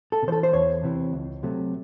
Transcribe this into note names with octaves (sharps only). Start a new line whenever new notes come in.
A4
C3
E3 A4 C5
C5
E2 C#5
C3 E3
C#2
C3 F#3 A3